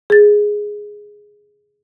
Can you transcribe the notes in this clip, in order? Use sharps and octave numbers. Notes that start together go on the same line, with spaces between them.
G#4 A6